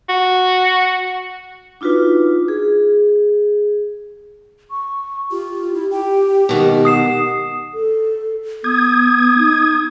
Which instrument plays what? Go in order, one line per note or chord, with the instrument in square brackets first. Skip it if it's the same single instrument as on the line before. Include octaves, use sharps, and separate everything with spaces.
[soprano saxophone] F#4
[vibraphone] D4 D#4 F4 F#4 B4
G#4
[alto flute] C#6
[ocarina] F4 [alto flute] G4
[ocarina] E4
[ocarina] G4 [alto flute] G5
[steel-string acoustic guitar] B2 D#3 [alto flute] G#3
[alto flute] F#5 [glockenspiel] D#6 C7 E7
[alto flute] A4
[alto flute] B3 [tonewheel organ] D#6 G#6
[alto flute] D#4